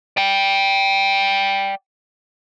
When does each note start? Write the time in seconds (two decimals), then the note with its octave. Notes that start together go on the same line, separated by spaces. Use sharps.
0.17 D5 G5